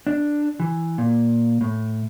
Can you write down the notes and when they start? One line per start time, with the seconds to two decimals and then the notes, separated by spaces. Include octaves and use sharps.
0.07 D4
0.60 E3
0.98 A#2
1.61 A2